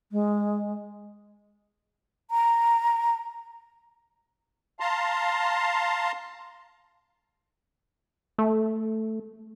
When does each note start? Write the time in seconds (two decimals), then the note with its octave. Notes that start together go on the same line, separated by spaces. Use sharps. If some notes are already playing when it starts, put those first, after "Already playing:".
0.11 G#3
2.31 A#5
4.80 F5 A5 A#5 C6
8.38 A3